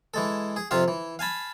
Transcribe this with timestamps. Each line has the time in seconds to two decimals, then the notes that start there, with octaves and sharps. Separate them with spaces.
0.14 E3 G#3 A4
0.56 G#4
0.71 F2 C3 F4 E5 F5
0.88 E3
1.19 F5 G#5 A5 B5